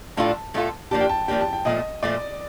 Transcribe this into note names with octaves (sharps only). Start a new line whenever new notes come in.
A2 A3 D4 F4 A4 A5
A2 A3 D4 F4 A4
F3 A#3 D4 G4 A5
G5
A5
F3 A#3 D4 G4 G5
A5
G5
A#2 F3 A3 D#5
A#2 F3 A3 D5